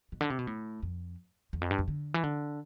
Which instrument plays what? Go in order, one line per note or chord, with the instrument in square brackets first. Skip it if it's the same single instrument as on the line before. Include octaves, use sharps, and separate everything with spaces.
[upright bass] B2
D3
C3
B2
A2
F2
E2
F2
G2
F2
D3
E3
D3